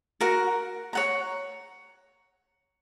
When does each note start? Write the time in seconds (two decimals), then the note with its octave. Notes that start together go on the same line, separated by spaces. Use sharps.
0.21 F#4 A#4 F#5
0.93 C#5 F#5 A#5